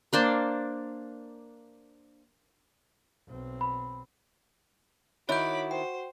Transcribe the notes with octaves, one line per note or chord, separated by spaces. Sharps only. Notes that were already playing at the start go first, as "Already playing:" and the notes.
A#3 D4 C5
B1 C4
B5
D#3 E4 F#4 C#5 B5 D6 G6
C5 G5